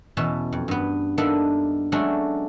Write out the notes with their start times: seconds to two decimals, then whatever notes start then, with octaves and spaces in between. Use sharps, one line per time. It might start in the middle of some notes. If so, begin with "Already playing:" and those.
0.17 E2 B2 C#4 E5 A5
0.53 F2
0.68 G2 B3
1.18 A#3 B3 D4 D#4 A4 E5
1.92 F#3 G#3 A3 C#4 D4